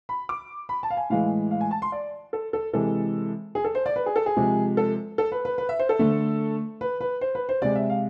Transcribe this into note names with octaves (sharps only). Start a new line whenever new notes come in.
B5
D6
B5
A5
F5
G#5
A2 E3 G#3 F5
F5
G#5
A5
C6
D5
A4
A4
C3 E3 G#3 A4
G#4
A4
C5
D5
B4
G#4
A4
G#4
C3 F3 G#3
A4
A4
B4
B4
B4
E5
C5
A4
D3 A3
B4
B4
C5
B4
C5
C3 G#3 D5
E5
F5